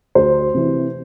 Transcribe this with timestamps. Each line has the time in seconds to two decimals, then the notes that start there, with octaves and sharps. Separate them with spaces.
0.15 D2 C5
0.54 C3 E3